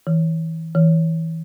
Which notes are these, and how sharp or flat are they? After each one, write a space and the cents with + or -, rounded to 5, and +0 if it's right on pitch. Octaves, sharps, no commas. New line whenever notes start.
E3 -25
E3 -20